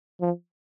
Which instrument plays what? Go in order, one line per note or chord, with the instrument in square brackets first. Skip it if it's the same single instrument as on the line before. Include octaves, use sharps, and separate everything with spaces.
[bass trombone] F3